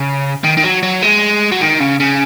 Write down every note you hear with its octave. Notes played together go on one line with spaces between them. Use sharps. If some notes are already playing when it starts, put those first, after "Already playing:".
Already playing: C#3
D#3
D#3
F#3
F#3
G#3
F#3
D#3
C#3
C#3